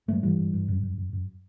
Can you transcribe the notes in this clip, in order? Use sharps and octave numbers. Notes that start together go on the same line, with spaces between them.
G2 F#3 A3
G2 E3 G3
G2
G2
F#2
F#2
F#2
F#2